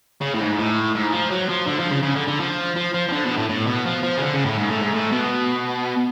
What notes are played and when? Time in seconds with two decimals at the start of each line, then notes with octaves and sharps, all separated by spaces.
0.21 C#3
0.35 A2
0.41 G#2
0.59 A2
0.95 G#2
1.12 F3
1.30 F#3
1.49 F3
1.68 D3
1.79 F3
1.91 C#3
2.03 C#3
2.16 D3
2.28 D3
2.40 F3
2.76 F3
2.94 F3
3.09 F3
3.12 D3
3.24 B2
3.37 A2
3.49 A2
3.67 B2
3.86 F3
4.03 F3
4.17 C#3
4.22 D3
4.34 C#3
4.45 A2
4.58 G#2
4.70 A2
4.82 G#2
4.94 A2
5.12 B2